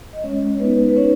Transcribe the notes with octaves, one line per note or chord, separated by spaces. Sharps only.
D#5
G#3 C#4 C#5
B3 D#4 B4
B4
C#4 D#4 C#5